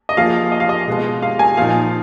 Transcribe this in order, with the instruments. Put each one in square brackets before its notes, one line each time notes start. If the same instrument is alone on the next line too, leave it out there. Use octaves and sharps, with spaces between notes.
[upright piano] D#5
[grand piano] F3 A#3 F4 G#4 [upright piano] F5
[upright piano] D#5
F5
D#5
[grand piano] B2 G#3 B3 F4 G#4
[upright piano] F5
G#5
[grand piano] A#2 F3 A#3 D#4 [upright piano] F5